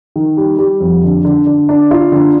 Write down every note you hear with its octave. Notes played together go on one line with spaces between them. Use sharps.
D#3
G3
G3
F2
D3
D3
D3
D4
F4
D3